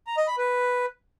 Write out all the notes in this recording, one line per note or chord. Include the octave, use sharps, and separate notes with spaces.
A#5
D#5
B5
B4